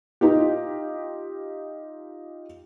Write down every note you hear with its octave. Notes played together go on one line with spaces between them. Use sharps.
D#4 F4 G4